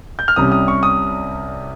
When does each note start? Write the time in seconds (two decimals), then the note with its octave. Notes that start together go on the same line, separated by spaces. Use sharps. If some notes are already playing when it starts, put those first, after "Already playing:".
0.19 G6
0.28 F6
0.36 C2 C3 G3 C#4 D#6
0.52 D#6
0.68 C#6
0.83 D#6